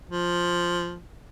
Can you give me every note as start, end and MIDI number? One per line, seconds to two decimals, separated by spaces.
0.10 0.98 53